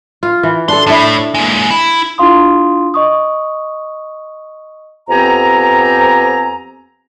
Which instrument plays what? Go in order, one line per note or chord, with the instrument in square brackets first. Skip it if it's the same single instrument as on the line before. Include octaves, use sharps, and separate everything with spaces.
[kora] F4
E3
[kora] D4 A4 [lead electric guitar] C6
[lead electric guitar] A2 [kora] D4 E4
[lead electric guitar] G#3 A#3
E4
[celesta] D4 E4 F4 F5 C6 D#6
D#5 C#6 D#6
[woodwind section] F2 B3 C4 G4 G#5 A#5